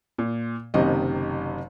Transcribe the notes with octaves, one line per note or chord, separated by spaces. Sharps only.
A#2
F#1 F#2 C3 D#3 D#5